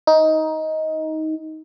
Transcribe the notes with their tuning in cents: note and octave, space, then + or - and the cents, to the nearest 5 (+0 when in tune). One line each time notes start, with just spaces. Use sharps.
D#4 +15